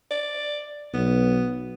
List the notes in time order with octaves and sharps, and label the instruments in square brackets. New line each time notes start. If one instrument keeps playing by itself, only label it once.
[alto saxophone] D5
[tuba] B1 [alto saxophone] B3